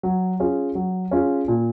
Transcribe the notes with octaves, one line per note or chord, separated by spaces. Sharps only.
F#3
C#4 F4 G#4
F#3
C#4 F4 G#4
A#2